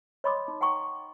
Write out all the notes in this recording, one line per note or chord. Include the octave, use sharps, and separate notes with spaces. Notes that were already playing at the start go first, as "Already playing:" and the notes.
C#5 D#5 B5 C6 D6 D#6
D#4
F#5 G5 A#5 C#6 D6